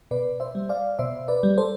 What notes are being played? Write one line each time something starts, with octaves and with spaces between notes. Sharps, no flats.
B2 B4 D5
C5 E5
G3
D5 F5
B2 C5 E5
B4 D5
G3
A4 C5